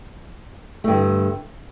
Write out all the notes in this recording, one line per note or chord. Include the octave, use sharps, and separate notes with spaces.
G2 D3 A3